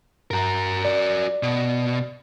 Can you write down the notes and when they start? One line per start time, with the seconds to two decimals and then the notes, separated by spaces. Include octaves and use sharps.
0.31 G2 F#4 A#4 A#5
0.85 D5
1.43 B2